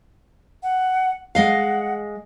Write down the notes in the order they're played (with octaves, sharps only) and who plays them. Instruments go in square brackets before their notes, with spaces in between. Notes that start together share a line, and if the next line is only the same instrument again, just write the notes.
[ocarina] F#5
[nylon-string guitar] G#3 D#5 F5 [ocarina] F#5